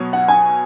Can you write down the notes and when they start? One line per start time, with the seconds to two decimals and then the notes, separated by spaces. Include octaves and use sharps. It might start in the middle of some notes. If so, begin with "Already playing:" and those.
Already playing: B2 F#3 B3 F#4 C#5
0.13 F#5
0.28 G#5